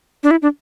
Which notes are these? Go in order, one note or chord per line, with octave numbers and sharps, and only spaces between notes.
D4
E4
D4